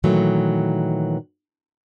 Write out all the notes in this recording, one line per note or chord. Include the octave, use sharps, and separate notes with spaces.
A#2 D#3 E3 F#3 A3